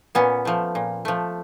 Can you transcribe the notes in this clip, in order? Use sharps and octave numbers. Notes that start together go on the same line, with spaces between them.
A#2 B3 C#4
F3 A3
A#2
F3 A3